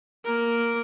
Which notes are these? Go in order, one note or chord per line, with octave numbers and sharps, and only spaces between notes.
A#3 A#4